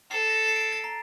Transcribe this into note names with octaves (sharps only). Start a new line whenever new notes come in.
A4 C7
A#6
C7
D7
C7
A6
A#5